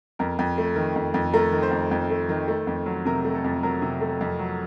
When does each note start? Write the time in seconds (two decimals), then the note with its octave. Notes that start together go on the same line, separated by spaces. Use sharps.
0.19 F2 A#4
0.39 F2
0.58 A3
0.76 D#3
0.96 F2
1.14 F2
1.33 A3 A#4
1.52 D#3
1.63 C5
1.71 F2
1.91 F2
2.10 A3
2.29 D#3
2.48 A3
2.67 F2
2.86 F#3
3.06 C3 A#4
3.25 A3
3.35 A4
3.44 F2
3.63 F#3 A#4
3.82 C3
4.01 A3
4.21 F2
4.39 F#3